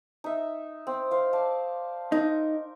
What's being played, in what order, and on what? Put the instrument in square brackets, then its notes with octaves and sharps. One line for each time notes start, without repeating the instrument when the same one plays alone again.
[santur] D#4 E5
C4
C5 F5
D5 F5 A5
[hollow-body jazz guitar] D#4 [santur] A#4